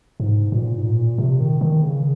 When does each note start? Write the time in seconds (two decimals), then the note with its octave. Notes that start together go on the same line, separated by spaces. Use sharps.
0.20 G#2
0.52 A#2
0.77 G#2
0.85 A#2
1.18 C3
1.40 D#3
1.61 D#3
1.83 C#3